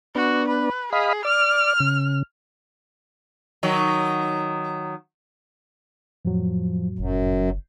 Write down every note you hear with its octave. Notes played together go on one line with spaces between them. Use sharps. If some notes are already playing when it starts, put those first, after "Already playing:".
B3 D4 F#4
B4
G#4 D#5 F5 B5
D5 F6
C#3
D#3 F#3
F2 A2 F3 F#3
F#1 F#2